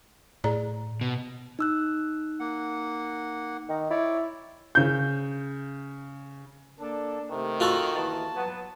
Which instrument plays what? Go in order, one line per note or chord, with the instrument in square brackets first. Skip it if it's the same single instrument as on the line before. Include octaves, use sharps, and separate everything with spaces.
[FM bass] A2 [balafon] G#4 D5 A#5
[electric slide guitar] B2
[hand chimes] D#4 E6 F#6
[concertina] A#3 F#5
[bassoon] D#3
[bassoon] E4 [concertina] C#5 D5
[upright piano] C#3 G6
[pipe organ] A#3 A4 [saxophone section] D4
[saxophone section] C3 [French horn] D#3 [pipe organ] A3
[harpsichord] F4 F#4 A4
[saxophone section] D#2 E3 [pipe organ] A5
[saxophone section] F#3 B3